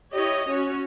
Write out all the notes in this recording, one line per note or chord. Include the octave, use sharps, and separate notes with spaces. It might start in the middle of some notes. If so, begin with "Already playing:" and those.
E4 G4 C#5 D#5
C#4 F#4 C#5